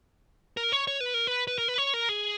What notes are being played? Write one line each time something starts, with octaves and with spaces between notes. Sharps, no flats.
A#4
C#5
C#5
B4
A#4
B4
B4
A#4
B4
C#5
A#4
G#4